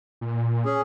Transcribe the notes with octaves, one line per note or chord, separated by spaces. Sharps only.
A#2
C#4 G#4